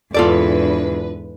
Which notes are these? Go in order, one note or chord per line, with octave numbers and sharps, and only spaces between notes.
E2 G#2 D3 F4 A4 B4 D5